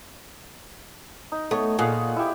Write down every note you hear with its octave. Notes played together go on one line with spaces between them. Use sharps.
D#4
A3 B3 C#5
A#2 G#4 F5 F#5
E4 G4